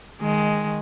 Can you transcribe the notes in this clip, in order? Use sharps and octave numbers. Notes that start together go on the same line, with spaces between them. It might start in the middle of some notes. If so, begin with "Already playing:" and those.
D#3 G#3